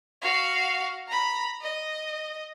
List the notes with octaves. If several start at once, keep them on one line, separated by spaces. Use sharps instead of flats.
F#4 F5
A#5 B5
D#5